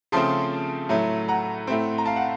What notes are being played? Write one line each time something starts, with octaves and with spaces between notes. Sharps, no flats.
C#3 F3 A3 C4 A5 C6
A2 F#3 A3
F#5 A#5
A2 A3 C4
A#5
F5 A5
F#5